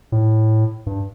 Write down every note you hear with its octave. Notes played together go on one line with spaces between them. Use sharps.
A2
G2